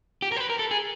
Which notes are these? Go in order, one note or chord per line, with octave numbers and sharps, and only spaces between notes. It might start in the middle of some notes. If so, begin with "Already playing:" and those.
G4
A#4
C5
B4
A#4
A4
G#4